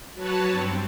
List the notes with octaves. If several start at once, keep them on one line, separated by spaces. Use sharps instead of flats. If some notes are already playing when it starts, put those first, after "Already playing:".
F#3 F#4 B4 C#5 A5
G2 C4